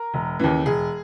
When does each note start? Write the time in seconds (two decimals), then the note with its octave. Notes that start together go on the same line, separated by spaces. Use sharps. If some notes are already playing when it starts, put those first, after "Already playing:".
Already playing: A#4
0.14 E1
0.39 D#2 C#3 E3
0.66 E1 G#4